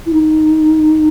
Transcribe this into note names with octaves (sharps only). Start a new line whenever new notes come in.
E4
D#4